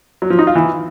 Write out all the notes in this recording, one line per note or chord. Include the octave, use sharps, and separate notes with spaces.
F#3
F3
D#4
F4
E3